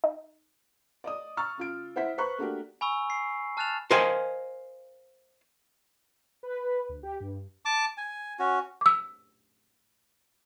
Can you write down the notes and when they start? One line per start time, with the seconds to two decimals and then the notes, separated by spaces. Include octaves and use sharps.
0.04 D#4
1.04 D5 D#5 D#6
1.37 A#5 C#6 E6 F6 A6
1.58 C#3 F4 D7
1.96 E4 C5 E5 F#5 B6
2.18 B4 C5 A#5 B5 C#6 F#6
2.38 A3 A#3 D4 F#4 G4 A#4
2.81 G#5 B5 C#6 E6
3.10 C7
3.57 A5 F6 F#6 A6 E7 F7
3.91 A#4 C5 D#5 F5 G5 G#5
6.43 B4
6.89 D2
7.03 G4
7.20 G2
7.65 A5 D6
7.97 G#5
8.39 C#4 F#4
8.81 D6 E6